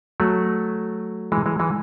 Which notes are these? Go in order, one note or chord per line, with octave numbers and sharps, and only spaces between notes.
F#3 A3
E3 G#3
E3 G#3
E3 G#3